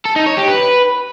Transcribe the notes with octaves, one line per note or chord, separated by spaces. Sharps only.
A4
D#4
C#5
G4
B4